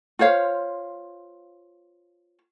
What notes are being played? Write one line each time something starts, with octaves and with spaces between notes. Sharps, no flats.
F4 C5 C#5 F5